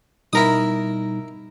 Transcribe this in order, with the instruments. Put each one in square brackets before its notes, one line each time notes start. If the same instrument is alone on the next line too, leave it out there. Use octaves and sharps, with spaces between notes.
[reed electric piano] B2 G3 D#4 [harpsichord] E4 A#4 D#6